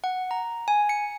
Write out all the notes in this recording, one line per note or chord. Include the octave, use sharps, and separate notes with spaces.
F#5
A#5
G#5
C#7